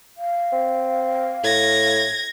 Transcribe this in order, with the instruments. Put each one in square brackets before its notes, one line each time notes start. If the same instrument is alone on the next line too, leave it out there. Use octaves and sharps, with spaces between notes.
[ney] F5
[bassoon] C4
[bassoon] A2 [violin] G#6 A#6